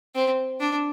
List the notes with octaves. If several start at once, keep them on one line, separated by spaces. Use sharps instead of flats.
C4
D4